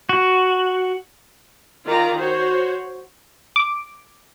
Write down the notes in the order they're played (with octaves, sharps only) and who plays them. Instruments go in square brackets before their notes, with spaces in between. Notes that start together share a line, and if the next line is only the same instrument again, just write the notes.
[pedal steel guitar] F#4
[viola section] D#3 F4 D5 A#5
F#4 C5 C#5
[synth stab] D6